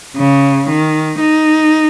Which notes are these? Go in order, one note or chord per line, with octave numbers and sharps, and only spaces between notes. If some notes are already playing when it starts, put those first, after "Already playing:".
C#3
D#3
D#4